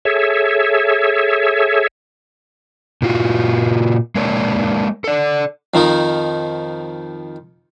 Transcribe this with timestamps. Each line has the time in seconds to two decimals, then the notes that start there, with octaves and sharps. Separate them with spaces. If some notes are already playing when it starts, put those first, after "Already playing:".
0.05 G#4 A4 C#5 E5
3.02 A#2 F4 F#4
4.15 G#3 A#3 D4 C#5
5.04 A4 D5
5.74 F2 D#3 F3 D#4